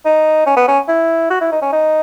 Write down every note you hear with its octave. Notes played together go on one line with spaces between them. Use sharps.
D#4
C#4
B3
C#4
E4
F#4
E4
D#4
C#4
D#4